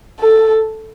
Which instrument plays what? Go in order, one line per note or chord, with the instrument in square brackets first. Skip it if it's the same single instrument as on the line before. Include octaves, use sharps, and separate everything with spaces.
[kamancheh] A4